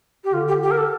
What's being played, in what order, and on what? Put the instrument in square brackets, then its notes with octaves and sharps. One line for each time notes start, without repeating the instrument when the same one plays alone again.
[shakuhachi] G4
[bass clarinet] D3 [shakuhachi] F4
[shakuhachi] G4
G4
A#4
A4